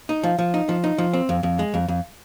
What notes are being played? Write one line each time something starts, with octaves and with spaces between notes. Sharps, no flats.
D#4
F3
F3
D#4
F3
D#4
F3
C4
F2
F2
G#3
F2
F2